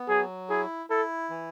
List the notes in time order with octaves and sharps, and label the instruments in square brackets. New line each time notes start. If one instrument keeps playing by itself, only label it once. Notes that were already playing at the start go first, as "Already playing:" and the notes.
Already playing: [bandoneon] B3
[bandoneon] F#3 [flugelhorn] G#4
[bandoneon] E4 [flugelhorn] G#4
[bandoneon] E4 [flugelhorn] A4
[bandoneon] E3